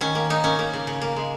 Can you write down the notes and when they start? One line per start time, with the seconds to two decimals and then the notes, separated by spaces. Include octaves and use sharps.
0.01 D#3 C#4
0.15 A#3
0.30 A#3 D#4
0.44 A#3 C#4
0.59 A#3
0.73 C#3
0.87 C#3
1.01 A#3
1.16 G#3